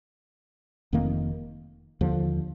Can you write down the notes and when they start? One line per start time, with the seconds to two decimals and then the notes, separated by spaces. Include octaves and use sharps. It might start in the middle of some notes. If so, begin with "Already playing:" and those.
0.92 F1 F2 D#3 A#3
2.01 D#2 D3 F3